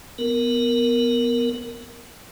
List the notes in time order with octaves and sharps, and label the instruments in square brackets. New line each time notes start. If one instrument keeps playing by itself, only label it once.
[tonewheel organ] B3 A#4